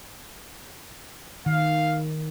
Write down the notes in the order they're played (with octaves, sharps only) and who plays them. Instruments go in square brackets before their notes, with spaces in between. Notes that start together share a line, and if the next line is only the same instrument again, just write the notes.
[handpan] D#3 [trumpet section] F5